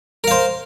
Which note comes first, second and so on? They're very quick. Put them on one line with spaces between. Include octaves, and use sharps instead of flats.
A#4 F5 C5